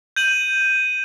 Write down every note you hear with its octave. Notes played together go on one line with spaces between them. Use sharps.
G6 D#7 F#7